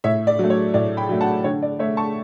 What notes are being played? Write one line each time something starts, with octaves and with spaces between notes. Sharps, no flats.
A2 C#5 E5
D5
F#3 A3
C#5
A2 D5
G5 B5
F#3 A3
F#5 A5
D3 C#5
D5
A3 C#5 E5
A5 C#6